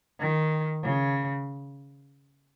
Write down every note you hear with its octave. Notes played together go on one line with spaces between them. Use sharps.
D#3
C#3